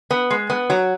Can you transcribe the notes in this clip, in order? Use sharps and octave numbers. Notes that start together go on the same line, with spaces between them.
B3
G#3
B3
F#3